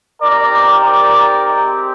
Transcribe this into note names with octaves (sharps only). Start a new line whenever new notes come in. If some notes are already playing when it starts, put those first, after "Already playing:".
C4 D#4 G4 A#4 D5
A#4 D5
G#3 C4 G4